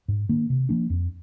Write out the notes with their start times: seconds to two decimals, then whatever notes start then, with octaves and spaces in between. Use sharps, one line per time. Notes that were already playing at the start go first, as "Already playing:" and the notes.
0.08 G#2
0.29 D#3 A#3 D4
0.50 C3
0.69 F3 A#3 D4
0.90 F2